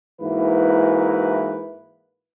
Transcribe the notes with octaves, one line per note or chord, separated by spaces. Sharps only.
G#2 E3 A#3 E4 F#4 B4